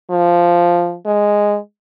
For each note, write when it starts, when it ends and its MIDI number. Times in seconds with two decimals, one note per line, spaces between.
0.11 0.96 53
1.06 1.57 56